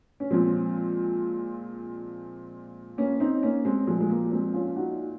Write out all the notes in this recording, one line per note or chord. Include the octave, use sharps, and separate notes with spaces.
C#4
A#2 F3 G#3 C4
A#3 C#4
C4 D#4
A#3 C#4
G#3 C4
A#2 F3 G#3
G#3
A#3
G#3 C4
C#4 F4
F4
D#4 F#4